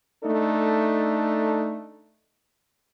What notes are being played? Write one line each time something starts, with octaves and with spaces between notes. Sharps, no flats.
A3 D4 D#4 A4